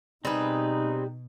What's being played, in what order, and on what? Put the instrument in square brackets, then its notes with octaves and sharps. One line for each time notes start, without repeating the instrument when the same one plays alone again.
[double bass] B2 [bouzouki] G3 B4 [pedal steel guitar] C4 G#4 [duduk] D#4